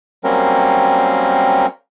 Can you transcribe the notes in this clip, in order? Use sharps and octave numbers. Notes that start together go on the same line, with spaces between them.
F#3 G3 A#3 C4 C#4 A#4